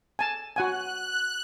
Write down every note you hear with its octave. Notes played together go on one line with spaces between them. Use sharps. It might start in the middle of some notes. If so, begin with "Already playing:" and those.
G#5 A5
F#4 F#5 G#5 F#6